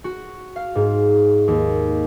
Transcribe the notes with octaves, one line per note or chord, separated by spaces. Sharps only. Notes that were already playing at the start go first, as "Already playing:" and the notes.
F#4
F5
G#2
D#2